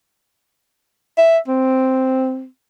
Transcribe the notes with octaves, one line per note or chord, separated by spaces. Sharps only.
E5
C4